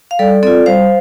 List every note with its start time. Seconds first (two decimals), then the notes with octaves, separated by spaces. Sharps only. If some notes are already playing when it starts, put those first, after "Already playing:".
0.11 F5
0.19 G3 A4 D5
0.43 C4 F4 A4 D5
0.66 G3 C5 F5